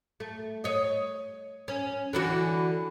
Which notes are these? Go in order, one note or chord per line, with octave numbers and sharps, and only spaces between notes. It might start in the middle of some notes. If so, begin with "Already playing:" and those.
A3
C#5 D#5
C#4
D3 E3 F#4